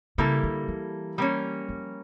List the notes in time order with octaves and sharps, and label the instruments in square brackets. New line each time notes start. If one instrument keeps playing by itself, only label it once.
[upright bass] C#3 [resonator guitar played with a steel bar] G3 A#3 E4 A4
[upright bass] D3
E3
[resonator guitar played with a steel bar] G3 A#3 C#4
[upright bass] F3